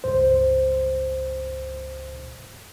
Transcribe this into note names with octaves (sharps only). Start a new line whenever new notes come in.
C#2 G2 C5